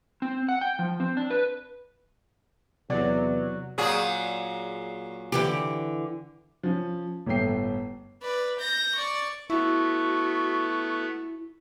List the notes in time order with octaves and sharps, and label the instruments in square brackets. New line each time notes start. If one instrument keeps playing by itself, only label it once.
[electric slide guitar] C4
F#5
G5
F3
C4
D4
B4
[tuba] E2 [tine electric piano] C3 [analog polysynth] F#3 [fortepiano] D5
[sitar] A#2 F#3 G#4
[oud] D3 E3 G4
[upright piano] F3 C#4
G1 A2 A3 G5 C7
[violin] B4 D5
G6 A#6
D5 C#6
[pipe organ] A3 B3 [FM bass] E4 [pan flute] F#4 [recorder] C#6